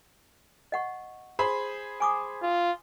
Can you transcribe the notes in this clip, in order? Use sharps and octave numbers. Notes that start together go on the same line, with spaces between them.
D#5 F#5 C#6
G#4 C5 B5
G#5 D6 D#6
F4